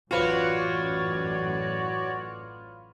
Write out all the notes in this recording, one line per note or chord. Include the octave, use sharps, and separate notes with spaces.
A1 F#2 A2 F4 F#4 B4 C#5 D5